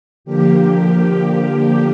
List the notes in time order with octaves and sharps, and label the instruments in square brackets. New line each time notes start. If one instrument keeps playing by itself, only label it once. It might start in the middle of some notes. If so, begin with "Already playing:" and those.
[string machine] D3 F3 A#3 G4